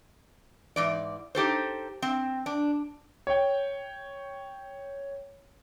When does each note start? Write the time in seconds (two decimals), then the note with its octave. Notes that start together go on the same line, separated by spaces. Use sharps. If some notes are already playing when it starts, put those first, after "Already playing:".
0.76 G#2 E3 D5
1.35 D#4 G4 A4 C5
2.02 C4
2.46 D4
3.27 C#5 G5